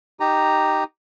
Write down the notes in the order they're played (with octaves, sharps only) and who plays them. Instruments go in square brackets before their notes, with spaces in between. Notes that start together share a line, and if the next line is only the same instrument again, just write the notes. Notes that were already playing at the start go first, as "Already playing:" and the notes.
[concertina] D#4 G4 A#5